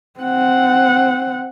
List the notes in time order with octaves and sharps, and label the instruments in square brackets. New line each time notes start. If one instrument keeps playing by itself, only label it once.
[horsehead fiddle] C4 F#5